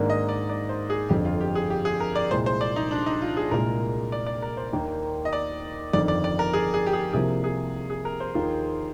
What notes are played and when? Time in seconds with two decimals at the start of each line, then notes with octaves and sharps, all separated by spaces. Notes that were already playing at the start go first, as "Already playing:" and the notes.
Already playing: G#2 D#3 A#3 D4
0.10 D#5
0.29 D5
0.49 D5
0.69 C5
0.90 G#4
1.09 G1 F2 D3 G4
1.25 F4
1.41 G4
1.55 G#4
1.70 G4
1.85 G#4
2.00 A#4
2.16 D5
2.30 C2 A#2 G#3 C5
2.46 C5
2.61 D5
2.76 D#4
2.91 D4
3.06 D#4
3.22 F4
3.37 G#4
3.51 C2 A#2 G#3 A#4
4.12 D5
4.26 D5
4.42 A#4
4.57 C5
4.73 D#2 D#3 A#3
5.25 D#5
5.33 D5
5.93 G1 F2 D#3 D5
6.08 D5
6.24 D5
6.39 A#4
6.54 G#4
6.74 G#4
6.86 G4
6.93 G#4
7.13 C2 C3 F3 A#3 G#4
7.44 G#4
7.90 G#4
8.05 A#4
8.20 C5
8.34 D#2 D#3 A#3 F4